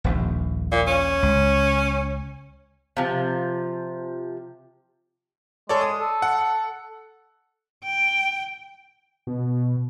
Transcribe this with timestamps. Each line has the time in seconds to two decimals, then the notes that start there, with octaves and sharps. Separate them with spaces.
0.04 D#1 A#1 D#2
0.72 A#2
0.87 C#4
1.23 C#2
2.97 C3 F3
5.69 G#3 A4 C#5 D5
5.81 D#6
5.99 A4
6.22 F#5
7.84 G5
9.27 B2